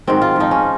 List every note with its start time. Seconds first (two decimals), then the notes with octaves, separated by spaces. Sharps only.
0.07 G#2 D#3 F#3 C4
0.22 F4
0.36 G#2 F3 D#4
0.51 C#4